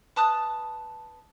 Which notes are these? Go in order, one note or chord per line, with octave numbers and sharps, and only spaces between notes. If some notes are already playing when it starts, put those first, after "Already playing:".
B4 A5 D#6 F#6